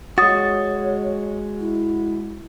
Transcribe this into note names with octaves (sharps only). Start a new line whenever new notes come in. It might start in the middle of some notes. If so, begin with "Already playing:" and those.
G#3 F#4 C#5 D#6 A6
E4